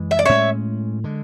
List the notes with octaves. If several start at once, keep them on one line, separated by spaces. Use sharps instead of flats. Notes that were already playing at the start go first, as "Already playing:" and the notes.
Already playing: F#2 E3 G#3
E5
D5
A2 G#3 C#4 C#5 E5
D3 G#3